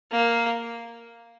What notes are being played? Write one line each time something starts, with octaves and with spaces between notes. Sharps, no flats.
A#3